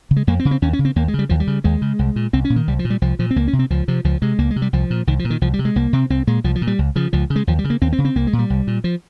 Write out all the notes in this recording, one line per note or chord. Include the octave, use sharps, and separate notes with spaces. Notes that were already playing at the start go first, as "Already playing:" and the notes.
C#3
G#3
F2 A#3
C4
C#3
C4
D#2 C#4
C#4
C#3
C4
D#2 A#3
G#3
C#3
G3
D#2 F3
G3
C#3
D#2 G#3
C#3
C2
A#2
C2 C4
C#4
A#2
D#3
C2 G3
F3
A#2
G3
C2 F3
A#2 F3
C4
C#2 A#3
C#4
C3
C4
C#2 F3
C3 F3
C#2 F3
C3 G#3
C#2 A#3
G#3
C3
G3
C2 F3
A#2
C2 D#3
F3
A#2
D#3
C2 F3
G3
C3
G#3
C2 A#3
C3 C4
C2 C4
A#2 G#3
C2 F3
F3
A#2
G3
C#2
C#3 F3
C#2 F3
C#3
G#3
D#2 F3
G3
C#3
A#3
D#2 C4
C4
C#3
C4
C2 A#3
G#3
A#2
G3
C2
A#2
F3